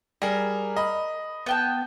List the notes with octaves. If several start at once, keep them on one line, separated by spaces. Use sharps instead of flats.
G3 G#4 A#4
D#5 B5
B3 G5 A5